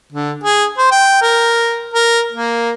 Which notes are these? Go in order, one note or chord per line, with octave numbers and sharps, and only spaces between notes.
D3
G#4
C5
G5
A#4
A#4
A#3